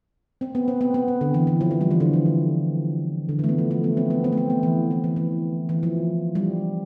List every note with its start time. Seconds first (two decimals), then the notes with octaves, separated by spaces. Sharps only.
0.41 C4
0.55 B3
0.68 C4
0.81 B3
0.94 B3
1.08 C4
1.21 D3
1.34 E3
1.47 E3
1.61 F3
1.71 F3
1.81 G3
1.91 E3
2.00 D3
2.13 E3
2.26 D3
3.29 D3
3.39 E3
3.44 A3
3.49 B3
3.58 F3
3.71 A3
3.84 B3
3.97 C4
4.10 B3
4.24 C4
4.32 A3
4.37 B3
4.50 B3
4.63 E3
4.91 E3
5.04 E3
5.16 E3
5.69 E3
5.83 F3
6.35 G3